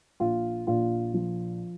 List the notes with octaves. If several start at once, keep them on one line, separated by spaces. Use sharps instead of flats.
A#1 F4
A#1 F4
F3